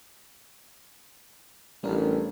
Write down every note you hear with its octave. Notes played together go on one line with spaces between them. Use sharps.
A1 G3 D4 A#4